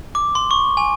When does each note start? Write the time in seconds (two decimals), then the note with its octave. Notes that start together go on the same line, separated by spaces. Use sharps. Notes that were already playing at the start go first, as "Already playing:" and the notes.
0.15 D6
0.35 C6
0.51 C#6
0.77 G#5